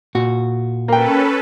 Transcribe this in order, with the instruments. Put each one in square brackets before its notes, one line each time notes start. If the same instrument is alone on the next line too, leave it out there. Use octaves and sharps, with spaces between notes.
[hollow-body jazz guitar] A#2 F#4
[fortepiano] A#3 G5 [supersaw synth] C#4 A4 B4